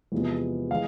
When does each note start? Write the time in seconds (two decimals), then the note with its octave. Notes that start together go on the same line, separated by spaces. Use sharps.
0.12 E2 C3 F3 G#3 B3
0.71 E3 G#3 F5